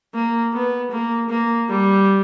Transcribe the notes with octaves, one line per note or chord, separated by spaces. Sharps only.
A#3
B3
A#3
A#3
G3